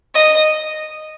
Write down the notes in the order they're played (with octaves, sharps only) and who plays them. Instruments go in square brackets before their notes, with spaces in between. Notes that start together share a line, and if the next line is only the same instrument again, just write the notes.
[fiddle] D#5